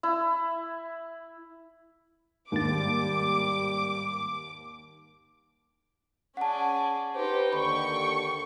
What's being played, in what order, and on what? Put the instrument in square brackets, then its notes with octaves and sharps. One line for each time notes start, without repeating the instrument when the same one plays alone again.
[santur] E4
[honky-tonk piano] D#2 [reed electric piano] G#2 A6 [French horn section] G3 [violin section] D6
[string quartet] C#4 G#4 D5 [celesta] F#5 A5
[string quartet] D#4 G4 [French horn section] B4 C5
[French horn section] D#2 D3 [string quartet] G5 [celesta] B5 [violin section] C#6